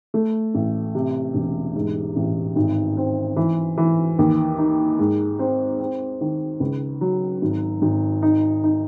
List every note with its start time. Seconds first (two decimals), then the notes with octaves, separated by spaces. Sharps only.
0.14 A3
0.54 A1
0.95 C3
1.34 E1
1.75 G#2
2.16 A1
2.56 G#1
2.97 C4
3.36 E3
3.77 E3
4.19 D#2
4.58 D#4
4.99 G#2
5.39 C4
5.80 C4
6.21 D#3
6.60 C#2
7.01 F#3
7.42 G#1
7.82 G#1
8.22 D#4
8.64 D#4